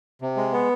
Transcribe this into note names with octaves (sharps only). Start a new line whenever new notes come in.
C3
G#3
B3